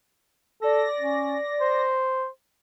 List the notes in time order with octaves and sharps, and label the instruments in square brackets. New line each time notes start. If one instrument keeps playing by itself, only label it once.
[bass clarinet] A4 [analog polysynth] D5 A#6
[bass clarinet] C#4
C5